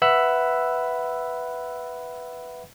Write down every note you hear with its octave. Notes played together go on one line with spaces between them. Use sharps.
B4 E5 F#5 B5 E6 F#6